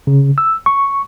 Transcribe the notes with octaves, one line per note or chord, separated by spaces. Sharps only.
C#3
E6
C#6